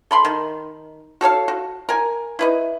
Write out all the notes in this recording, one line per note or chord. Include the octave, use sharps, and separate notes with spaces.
A4 B5 C6
D#3
F#4 A4 C#5 F5
F#4
A#4 G#5
E4 B4 D#5